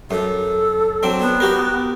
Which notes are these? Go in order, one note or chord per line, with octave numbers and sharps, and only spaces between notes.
F#2 A4
F#3 C4 D4
B3
F#4 G4 A#4